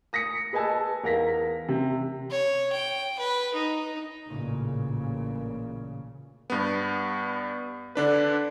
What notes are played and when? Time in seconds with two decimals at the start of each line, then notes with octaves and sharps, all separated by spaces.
0.13 D#6 A#6 B6 C#7
0.53 G#4 B4 D#5 G#5 A5 E6
1.03 E2 A#4 F5 A#6 B6
1.69 C3
2.31 C#5
2.72 G5
3.19 B4
3.54 D#4
4.27 A1 A#2 C#3
6.50 G2 B3
7.95 D3 D4 B4